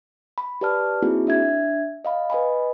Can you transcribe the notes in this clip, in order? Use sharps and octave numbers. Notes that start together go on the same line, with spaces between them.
B5
G4 B4 D5 A5 F6
A#3 C4 D#4 E4 F#4 G#4
D4 E5 G#6
D#5 F5 B5
B4 D#5 G#5 B5